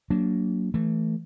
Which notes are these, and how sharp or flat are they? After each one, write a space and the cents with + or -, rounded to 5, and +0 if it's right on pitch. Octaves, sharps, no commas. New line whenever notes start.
F#3 +10 A#3 +0 D4 -10
E3 +0 A3 +0